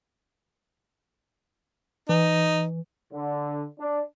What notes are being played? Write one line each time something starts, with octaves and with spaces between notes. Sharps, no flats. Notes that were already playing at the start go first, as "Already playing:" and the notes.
E3 D#4
D3
D4